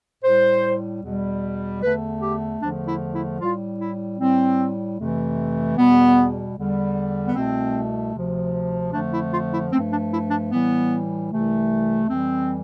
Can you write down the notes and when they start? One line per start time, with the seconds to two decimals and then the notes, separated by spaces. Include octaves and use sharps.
0.24 A2 G3 C5
1.03 E2 B2 G3
1.83 E2 D3 A3 B4
2.22 G4
2.61 E2 D3 F3 A3 D4
2.87 E4
3.15 E4
3.41 A2 G3 F4
3.80 E4
4.19 A2 G3 C4
4.98 F2 C3 E3 A3
5.77 E2 B2 G3 B3
6.57 E2 D3 G3
7.25 B3
7.35 C2 B2 A3 C4
8.14 D2 C3 F3
8.93 F2 D3 F3 A3 D4
9.13 E4
9.33 F4
9.53 E4
9.71 G2 F3 A3 C4
9.92 D4
10.11 E4
10.31 D4
10.50 A2 E3 G3 B3
11.30 C2 C3 E3 A3
12.09 F2 E3 G3 C4